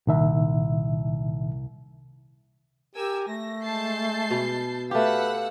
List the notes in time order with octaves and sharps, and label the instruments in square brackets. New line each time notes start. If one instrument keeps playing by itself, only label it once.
[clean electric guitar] C2 [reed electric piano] A#2 D#3 E5
[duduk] G4 [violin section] A#4 G#5 E6
[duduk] A3 [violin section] A#6
[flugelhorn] G#3 [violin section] A5 G6 C7
[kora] B2
[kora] A3 G4 [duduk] B4 [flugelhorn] F5 [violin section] F#5 E6